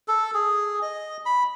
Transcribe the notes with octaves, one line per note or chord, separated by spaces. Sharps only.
A4
G#4
D#5
B5